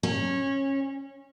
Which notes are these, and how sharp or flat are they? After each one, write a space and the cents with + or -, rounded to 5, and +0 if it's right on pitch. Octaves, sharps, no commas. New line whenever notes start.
C#4 -20